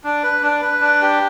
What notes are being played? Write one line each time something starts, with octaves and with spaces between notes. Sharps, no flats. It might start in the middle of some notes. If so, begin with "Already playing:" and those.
D4
B4
D4
B4
D4
G4